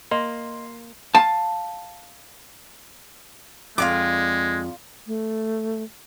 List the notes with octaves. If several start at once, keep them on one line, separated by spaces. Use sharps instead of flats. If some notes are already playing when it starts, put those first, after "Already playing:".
A#3 D#5 C6
F5 A5
F2 G#3 F4 D5 D6
A3